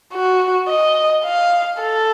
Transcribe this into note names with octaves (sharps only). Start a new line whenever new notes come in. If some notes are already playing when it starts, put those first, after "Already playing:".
F#4
D#5
F5
A4